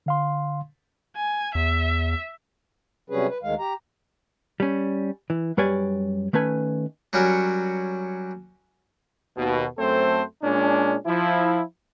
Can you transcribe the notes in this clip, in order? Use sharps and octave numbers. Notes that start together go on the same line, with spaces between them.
D3 F5 C6
G#5
E2 E5
C3 F#3 G3 C#4 G#4 B4
B4
D2 D#3 G#3 F5
G4 A#5
G3 C#4
E3
F#2 G3 B4 C#5 D5 G#5
D#3 A3 C#4 B4 G#5
F#3 G3 C#4 F#4 A#4
D#2 B2
F#2 A3 C4 A4 C5
A#2 G#3 C#4 D4
F3 E4